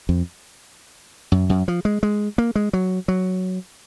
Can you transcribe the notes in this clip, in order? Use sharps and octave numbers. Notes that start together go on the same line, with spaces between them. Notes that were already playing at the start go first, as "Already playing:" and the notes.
F2
F#2
F#2
F3
G#3
G#3
A#3
G#3
F#3
F#3